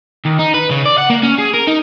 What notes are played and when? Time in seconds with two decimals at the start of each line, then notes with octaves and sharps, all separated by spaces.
0.25 D#2
0.39 D#4
0.54 B4
0.71 C#3
0.85 D5
0.98 F#5
1.10 A#3
1.23 C#4
1.39 G#4
1.54 A#4
1.68 D#4